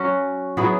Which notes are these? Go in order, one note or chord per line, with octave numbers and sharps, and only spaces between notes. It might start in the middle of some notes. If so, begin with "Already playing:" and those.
Already playing: F#3 C#4 F#4
F#3 B3 E4 G#4